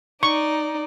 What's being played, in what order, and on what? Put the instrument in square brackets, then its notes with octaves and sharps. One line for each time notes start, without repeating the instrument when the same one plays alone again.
[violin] D#4 D5 [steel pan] C#6